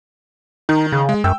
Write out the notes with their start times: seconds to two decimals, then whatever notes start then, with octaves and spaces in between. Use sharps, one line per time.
0.69 D#3 D#4
0.92 C#3
1.09 G#3
1.24 F#2 G5 E6